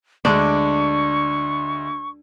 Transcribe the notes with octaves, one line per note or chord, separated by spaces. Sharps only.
D2 G#3 D4 C#6 D6